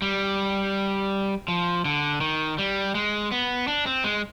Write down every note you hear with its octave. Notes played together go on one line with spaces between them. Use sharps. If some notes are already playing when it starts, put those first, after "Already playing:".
G3
F3
D3
D#3
G3
G#3
B3
D4
C4
G#3